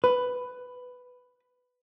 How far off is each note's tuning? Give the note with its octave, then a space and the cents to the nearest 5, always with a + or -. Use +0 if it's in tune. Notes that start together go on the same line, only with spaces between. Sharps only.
B4 +10